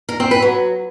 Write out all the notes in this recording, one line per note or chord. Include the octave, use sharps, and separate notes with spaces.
A#4
C4
B4
F#3